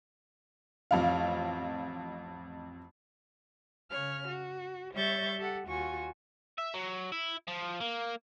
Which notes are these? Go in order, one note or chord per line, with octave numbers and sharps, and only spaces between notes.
A1 F2 F5
C#3 C#5 F6
F#4
G3 C#5 E5 C#6 G6 A6
G4 A4 F#5
D#2 F4 F#4 G#5 C#6
E5
F#3
E4
F3
A#3